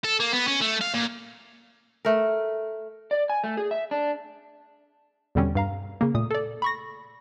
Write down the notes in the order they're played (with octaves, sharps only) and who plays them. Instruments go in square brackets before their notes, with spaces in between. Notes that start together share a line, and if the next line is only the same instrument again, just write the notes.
[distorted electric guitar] A4
A#3
B3
C#4
A3
F5
A#2
[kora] A3 A#4
[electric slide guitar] D5
G#5
A3
G#4
E5
D4
[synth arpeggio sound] E2 B2 D3 G3 C4 C#4
G2 F5 A#5
C#3 A#3
A#2 A3 D#6
A4 D5
B5 C#6 A#6